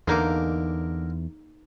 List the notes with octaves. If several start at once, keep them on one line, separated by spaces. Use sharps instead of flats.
E2 D3 A#3 D#4 G#4 A#4 D6